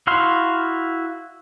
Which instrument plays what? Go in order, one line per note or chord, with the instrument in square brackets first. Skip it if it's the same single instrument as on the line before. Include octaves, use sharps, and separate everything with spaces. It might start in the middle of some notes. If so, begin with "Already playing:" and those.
[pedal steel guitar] E4 F#4 F5 C6